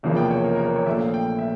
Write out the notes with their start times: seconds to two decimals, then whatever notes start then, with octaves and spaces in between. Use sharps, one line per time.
0.03 F1 E2 C#3 F3 A#3
0.17 G5
0.31 C#5
0.44 A#4
0.55 A#4
0.65 A#4
0.76 C#5
0.86 A#1 A#2 A3 E5
1.00 F5
1.14 G5
1.39 E5